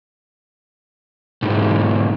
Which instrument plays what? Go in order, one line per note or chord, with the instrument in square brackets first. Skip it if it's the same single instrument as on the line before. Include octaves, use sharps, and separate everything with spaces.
[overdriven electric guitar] B1 G#2